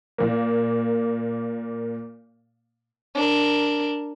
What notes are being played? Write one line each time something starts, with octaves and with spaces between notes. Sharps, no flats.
A#2 A#3
D4 A#4